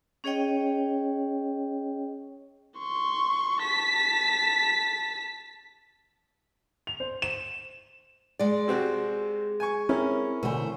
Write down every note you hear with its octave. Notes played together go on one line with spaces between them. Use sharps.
C#4 G#4 C#5 D#5 G5
C6 C#6
A5 B6
F7
C5
E7
G#3 D5
C3 C4 F#4
G#5 C#6
C4 C#4 E4 A#4 C#5
B2 D3 E3 A3 C5